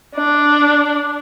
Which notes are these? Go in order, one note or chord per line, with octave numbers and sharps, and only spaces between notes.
D4